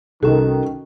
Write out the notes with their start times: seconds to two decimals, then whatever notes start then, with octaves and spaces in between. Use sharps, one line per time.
0.23 C2 D#3 C#4 F#4 A4